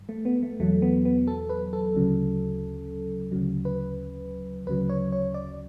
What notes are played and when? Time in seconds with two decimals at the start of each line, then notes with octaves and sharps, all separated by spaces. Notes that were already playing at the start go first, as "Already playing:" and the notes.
Already playing: G2
0.09 A3
0.25 B3
0.43 A3
0.60 E2 B2 F#3 A3
0.82 B3
1.05 B3
1.27 A4
1.49 B4
1.73 A4
1.95 D2 C#3 F#3
3.31 D2 C#3 F#3
3.65 B4
4.67 D2 C#3 F#3 B4
4.89 C#5
5.12 C#5
5.34 D5